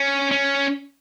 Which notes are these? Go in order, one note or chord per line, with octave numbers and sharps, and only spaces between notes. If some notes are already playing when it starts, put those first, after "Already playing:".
Already playing: C#4
C#4